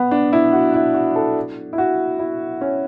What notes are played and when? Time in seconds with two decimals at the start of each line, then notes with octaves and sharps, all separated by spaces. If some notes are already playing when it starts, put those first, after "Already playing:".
Already playing: B3
0.11 D4
0.33 E4
0.53 F#4
0.74 E4
0.94 F#4
1.16 A4
1.73 E4
1.78 F#4
2.19 E4
2.61 C#4